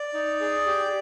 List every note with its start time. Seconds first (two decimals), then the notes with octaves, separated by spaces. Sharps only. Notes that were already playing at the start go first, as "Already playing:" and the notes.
Already playing: D5
0.14 D#4
0.40 G#4
0.67 G4